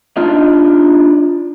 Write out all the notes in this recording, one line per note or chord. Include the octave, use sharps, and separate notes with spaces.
D4 D#4 F4 D#5